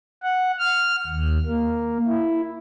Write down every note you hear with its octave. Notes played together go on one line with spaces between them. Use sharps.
F#5
F6
D#2
A#3
E4